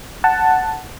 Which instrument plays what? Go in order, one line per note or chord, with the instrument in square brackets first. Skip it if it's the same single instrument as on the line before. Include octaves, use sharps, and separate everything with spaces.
[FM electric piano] F#5 A5